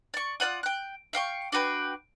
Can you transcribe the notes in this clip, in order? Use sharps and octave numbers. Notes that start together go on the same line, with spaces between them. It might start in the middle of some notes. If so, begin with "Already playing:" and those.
D5 C#6
F4 D5 F#5 D#6
G5 F#6
E5 F5 G5 C#6
D4 F#4 B4 G5